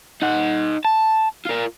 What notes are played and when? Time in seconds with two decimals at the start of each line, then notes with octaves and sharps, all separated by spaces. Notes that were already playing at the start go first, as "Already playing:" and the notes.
0.22 D#4 F#5
0.85 A5
1.45 F4 A#4